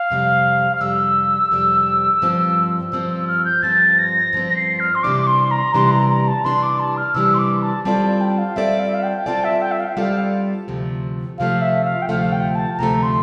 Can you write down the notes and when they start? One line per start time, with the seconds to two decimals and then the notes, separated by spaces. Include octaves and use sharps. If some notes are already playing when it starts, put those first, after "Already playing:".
Already playing: F5
0.10 F2 C3 G3
0.75 F6
0.81 F2 C3 G3 E6
1.52 F2 C3 G3
2.22 G2 F3 C4
2.92 G2 F3 C4 E6
3.10 E6
3.28 F6
3.45 G6
3.62 G2 F3 C4 A6
3.98 A#6
4.33 G2 F3 C4
4.48 A#6
4.57 C7
4.80 F6
4.95 C6
5.03 C3 E3 G3 D4 D6
5.22 D6
5.27 C6
5.51 A#5
5.74 C3 E3 G3 D4 C6
5.91 A#5
6.09 A#5
6.27 A5
6.44 C3 E3 G3 D4 C6
6.63 D6
6.79 A5
6.97 F6
7.15 C3 E3 G3 D4 E6
7.34 C6
7.39 D6
7.62 A5
7.85 G3 C4 F4 A4 D5 A5
8.03 A5
8.21 G5
8.38 F5
8.56 G3 C4 F4 A4 D5 E5
8.79 F5
8.87 E5
8.94 F5
9.03 G5
9.26 G3 C4 F4 A4 D5 A5
9.44 E5
9.62 G5
9.71 E5
9.80 F5
9.88 G5
9.97 G3 C4 F4 A4 D5 F5
10.68 D2 C3 F3 A3
11.38 D2 C3 F3 A3 F5
11.62 E5
11.85 F5
12.02 G5
12.08 D2 C3 F3 A3 F5
12.32 G5
12.55 A5
12.74 A5
12.79 D2 C3 F3 A3 A#5
13.03 C6